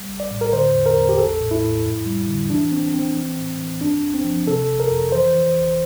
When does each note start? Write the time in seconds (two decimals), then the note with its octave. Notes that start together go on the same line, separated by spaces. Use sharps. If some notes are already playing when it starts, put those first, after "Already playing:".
Already playing: G3
0.09 A#1
0.20 D5
0.31 A2
0.41 A#4
0.53 D3 C5
0.75 E2
0.86 A#4
0.97 E2
1.09 G4
1.18 A1 A4
1.41 A2
1.51 E4
1.63 A2
1.85 F2
2.06 G3
2.28 D3
2.50 E3 D4
2.72 E3 C4
2.94 E3 C4
3.16 E3
3.38 A2
3.59 E3
3.81 G2 D4
4.03 G1
4.14 C4
4.24 F3
4.47 C3 A4
4.69 G1
4.80 A#4
4.91 F2
5.12 E3 C5
5.34 E3
5.57 G1